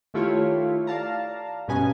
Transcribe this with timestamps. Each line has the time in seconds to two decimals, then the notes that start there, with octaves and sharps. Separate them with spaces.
0.14 D#3 A3 E4 F4 G4 C#5
0.87 D5 F5 A5 A#5
1.68 G2 B2 C#4 B4 D#5 G#5